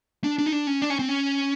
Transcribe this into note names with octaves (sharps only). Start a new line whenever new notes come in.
D4
D4
D#4
D4
C#4
D4
C#4
C4
C#4